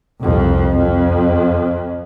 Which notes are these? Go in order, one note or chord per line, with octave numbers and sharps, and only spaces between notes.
C2 F2
F2